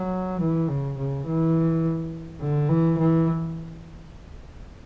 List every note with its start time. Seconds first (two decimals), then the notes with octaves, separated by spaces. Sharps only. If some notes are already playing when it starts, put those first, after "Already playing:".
Already playing: F#3
0.41 E3
0.69 C#3
0.97 C#3
1.26 E3
2.41 D3
2.69 E3
2.98 E3